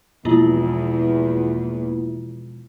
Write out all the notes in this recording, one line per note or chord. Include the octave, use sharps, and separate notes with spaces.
E2 B2 F3 G#3 A#3 E4 F4